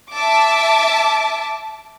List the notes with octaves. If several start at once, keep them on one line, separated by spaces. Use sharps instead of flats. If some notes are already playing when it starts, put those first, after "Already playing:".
E5 A5 D6